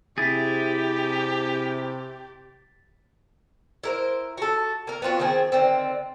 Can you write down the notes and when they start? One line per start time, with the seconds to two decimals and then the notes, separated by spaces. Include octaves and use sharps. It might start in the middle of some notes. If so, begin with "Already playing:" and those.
0.18 C3 E4 G4 G#4 A6 B6
3.83 E4 A#4 C5
4.37 F#4 A4
4.87 A#3 A#4
5.02 B3 C4 F4 F#4
5.20 D#3 F3 C4 G#4
5.52 D3 D#3 C4